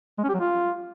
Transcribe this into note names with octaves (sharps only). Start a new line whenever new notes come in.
G#3
C#4
G4
F#3
F4